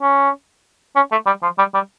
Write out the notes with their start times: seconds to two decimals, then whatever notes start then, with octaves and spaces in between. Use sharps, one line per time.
0.01 C#4
0.96 C#4
1.12 A3
1.26 G3
1.43 F3
1.58 G3
1.74 G3